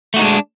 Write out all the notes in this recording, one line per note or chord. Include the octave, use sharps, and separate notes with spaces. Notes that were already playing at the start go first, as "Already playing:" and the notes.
G#3 A3 D4 D#4 F#4